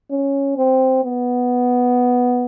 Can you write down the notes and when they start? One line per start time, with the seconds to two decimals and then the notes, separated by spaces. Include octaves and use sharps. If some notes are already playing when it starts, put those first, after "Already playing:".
0.11 C#4
0.57 C4
1.04 B3